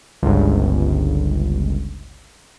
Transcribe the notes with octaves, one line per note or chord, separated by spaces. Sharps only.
G1 C#2